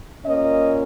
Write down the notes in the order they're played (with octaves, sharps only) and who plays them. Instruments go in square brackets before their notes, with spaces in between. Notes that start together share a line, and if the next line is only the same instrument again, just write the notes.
[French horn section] A#2 A#3 C#4 D#5